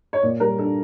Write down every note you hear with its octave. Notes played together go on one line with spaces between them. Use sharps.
C#5
A#2 D5
G3 A#4
D4 A4